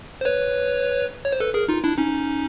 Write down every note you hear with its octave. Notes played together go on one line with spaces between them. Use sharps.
C5
B4 C#5
C#5
C5
A4 B4
G#4 A#4
D#4 F4
D4 E4
C#4 D#4